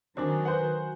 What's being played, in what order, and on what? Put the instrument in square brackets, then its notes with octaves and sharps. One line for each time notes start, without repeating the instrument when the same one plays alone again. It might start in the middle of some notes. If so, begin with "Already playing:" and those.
[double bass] D#3 F#3 [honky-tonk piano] C4 D4 [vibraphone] F#4 G#5
[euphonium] B4 [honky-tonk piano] C5 F#5